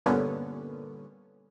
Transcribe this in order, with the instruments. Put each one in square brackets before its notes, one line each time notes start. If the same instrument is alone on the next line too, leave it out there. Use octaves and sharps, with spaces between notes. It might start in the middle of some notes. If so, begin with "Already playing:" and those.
[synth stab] G2 A#2 D3 B3 C#4